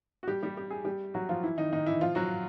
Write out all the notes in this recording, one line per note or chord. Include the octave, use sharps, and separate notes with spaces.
F#4
G3 G4
G3 G4
G4
G#4
G3 G4
F#3 F#4
F3 F4
E3 E4
D#3 D#4
D#3 D#4
E3 E4
F3 F4
F#3 F#4